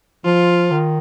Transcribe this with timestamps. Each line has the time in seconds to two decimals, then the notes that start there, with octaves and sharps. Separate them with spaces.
0.25 F3 F4
0.71 D#3